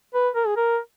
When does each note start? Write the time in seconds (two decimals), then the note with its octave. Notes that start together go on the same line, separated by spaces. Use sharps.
0.14 B4
0.35 A#4
0.47 G#4
0.56 A#4